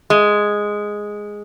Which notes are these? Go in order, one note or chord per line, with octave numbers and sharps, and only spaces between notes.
G#3